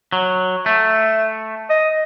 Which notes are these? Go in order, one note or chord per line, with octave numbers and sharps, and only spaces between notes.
F#3
A3 E5
D#5